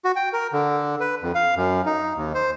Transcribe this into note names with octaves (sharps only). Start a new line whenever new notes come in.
F#4
G5
A#4
D3
B4
F2
F5
F#2
D#4
D#2
C5